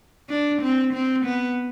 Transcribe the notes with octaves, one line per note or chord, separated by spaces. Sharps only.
D4
C4
C4
B3